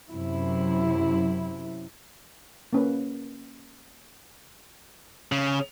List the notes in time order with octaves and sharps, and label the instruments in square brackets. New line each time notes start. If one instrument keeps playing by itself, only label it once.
[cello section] F#2 C3 E4
[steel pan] A#3 C#4 B4
[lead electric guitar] C#3